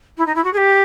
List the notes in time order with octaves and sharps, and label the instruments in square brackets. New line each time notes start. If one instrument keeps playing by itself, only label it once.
[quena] E4
D#4
E4
F#4
G#4
G4